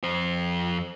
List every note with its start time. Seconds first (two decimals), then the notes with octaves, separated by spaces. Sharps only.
0.03 F2 C5